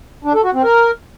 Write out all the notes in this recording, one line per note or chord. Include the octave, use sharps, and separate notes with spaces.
D4
A4
F#4
C4
A#4